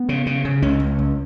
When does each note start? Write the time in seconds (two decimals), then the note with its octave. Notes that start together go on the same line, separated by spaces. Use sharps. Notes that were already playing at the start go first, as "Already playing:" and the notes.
Already playing: B3
0.09 C#3
0.26 C#3
0.45 C#3
0.62 C#2 C#4
0.80 C#2
0.99 C#2